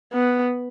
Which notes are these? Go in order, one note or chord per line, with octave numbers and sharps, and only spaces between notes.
B3